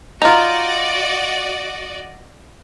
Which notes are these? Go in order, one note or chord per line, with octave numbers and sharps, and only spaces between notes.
D#4 F4 F#4 D5 D#5 A#5